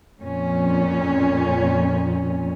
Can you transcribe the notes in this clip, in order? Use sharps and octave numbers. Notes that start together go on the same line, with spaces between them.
F2 A#2 C#4